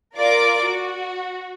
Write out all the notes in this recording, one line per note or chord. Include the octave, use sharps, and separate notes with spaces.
F4 A#4 D5 D6
F#4